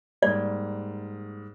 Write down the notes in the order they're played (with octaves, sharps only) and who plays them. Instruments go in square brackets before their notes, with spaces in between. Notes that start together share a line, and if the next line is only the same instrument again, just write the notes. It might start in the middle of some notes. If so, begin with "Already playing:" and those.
[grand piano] G#2 G3 A#3 [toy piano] D5